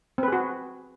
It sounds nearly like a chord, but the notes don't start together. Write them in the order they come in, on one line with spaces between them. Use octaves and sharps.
C4 B4 G#4 F#4